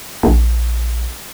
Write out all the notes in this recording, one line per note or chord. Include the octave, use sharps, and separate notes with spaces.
A#1